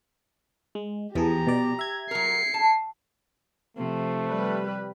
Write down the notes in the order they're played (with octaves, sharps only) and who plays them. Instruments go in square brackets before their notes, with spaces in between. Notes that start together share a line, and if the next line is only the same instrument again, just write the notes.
[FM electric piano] G#3
[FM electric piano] E2 E3 G#4 [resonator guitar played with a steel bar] F3 [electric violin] G4 A#5
[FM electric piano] B2 D5
E5 G#6
[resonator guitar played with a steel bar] F#3 A#4 [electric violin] C7 C#7
[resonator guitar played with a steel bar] A5
[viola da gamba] C3 F3 [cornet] A3
[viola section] G3 B4